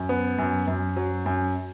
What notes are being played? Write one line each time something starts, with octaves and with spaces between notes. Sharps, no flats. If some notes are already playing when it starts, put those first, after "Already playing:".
Already playing: F#2
B3
F#2
F#2
F#3
F#2